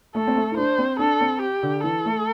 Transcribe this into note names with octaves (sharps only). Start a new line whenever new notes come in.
A3 A4
C4
A3
E4
D4 C5
C4
D4 A4
C4
G4
D3
E3 A4
A3